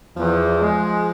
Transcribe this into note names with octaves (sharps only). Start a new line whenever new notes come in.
E2 F3
G#3